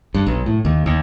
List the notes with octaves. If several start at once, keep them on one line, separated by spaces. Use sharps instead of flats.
G2
B1
A2
D#2
D#2